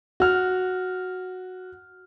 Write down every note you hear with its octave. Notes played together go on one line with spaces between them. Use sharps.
F#4 F6